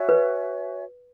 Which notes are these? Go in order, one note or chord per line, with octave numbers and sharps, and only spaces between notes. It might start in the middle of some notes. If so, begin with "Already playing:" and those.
Already playing: F#4 C#5 E5 G#5
B4